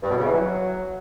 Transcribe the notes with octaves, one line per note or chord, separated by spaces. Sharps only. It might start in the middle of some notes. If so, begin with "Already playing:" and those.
G2
B2
C#3
E3
F#3